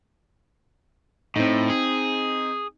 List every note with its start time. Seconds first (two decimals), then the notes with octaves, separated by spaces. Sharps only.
1.36 A2 C4 D#4
1.70 G#4